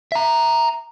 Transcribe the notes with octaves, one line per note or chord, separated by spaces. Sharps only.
E5 A#5